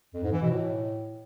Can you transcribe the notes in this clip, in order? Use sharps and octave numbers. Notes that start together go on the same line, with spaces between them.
F2
G#2
E3
B2
A2